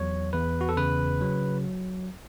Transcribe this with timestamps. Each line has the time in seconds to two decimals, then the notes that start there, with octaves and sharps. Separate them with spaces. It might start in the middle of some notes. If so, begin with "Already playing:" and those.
Already playing: E2 F#3 C#5
0.33 E2 B4
0.61 F#4
0.69 A4
0.77 C#3 B4
1.21 F#3